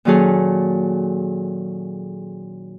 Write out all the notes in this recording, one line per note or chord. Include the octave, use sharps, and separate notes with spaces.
A#2 D#3 F#3 C#4 G#4 A4